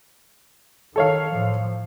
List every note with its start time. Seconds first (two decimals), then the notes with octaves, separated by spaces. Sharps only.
0.96 D#3 A4 C#5 F5
1.32 A2 F3